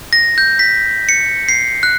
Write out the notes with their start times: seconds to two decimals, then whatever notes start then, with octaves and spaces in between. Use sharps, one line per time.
0.13 A#6
0.38 G6
0.59 B6
1.09 C#7
1.49 C7
1.83 F#6